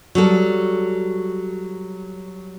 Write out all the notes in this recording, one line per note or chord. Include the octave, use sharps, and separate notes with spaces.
F#3 G3 A4